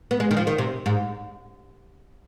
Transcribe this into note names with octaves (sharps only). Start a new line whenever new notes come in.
B3
G#3
D#3
F3
D#3
C3
G#2